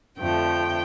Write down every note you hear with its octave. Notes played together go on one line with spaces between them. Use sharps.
F2 D3 F3 A3 G5